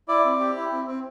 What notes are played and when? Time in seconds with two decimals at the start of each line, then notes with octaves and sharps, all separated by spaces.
0.08 E4 D5
0.24 C4
0.40 G4
0.56 E4
0.72 C4
0.88 C4